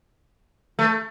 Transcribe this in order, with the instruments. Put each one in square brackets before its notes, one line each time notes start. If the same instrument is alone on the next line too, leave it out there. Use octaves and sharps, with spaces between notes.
[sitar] A3